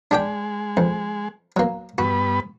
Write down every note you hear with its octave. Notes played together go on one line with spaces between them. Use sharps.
G#3 D4 G4 G5
F2
F#3 A#3
G2 B3 F#4 B4